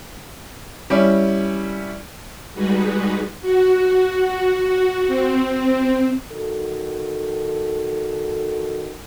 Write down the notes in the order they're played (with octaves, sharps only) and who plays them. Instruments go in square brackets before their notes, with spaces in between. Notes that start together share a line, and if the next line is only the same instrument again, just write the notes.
[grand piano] G3 C#4 E4
[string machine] G3 G#3 D#4 F#4 G#4 B4
F#4
C4
[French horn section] D#3 F#4 A4